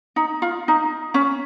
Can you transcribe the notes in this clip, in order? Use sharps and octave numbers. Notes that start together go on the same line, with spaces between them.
D#4
F4
D#4
C#4